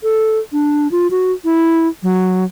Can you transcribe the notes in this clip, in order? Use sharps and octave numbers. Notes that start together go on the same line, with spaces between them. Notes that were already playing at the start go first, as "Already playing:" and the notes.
A4
D4
F4
F#4
E4
F#3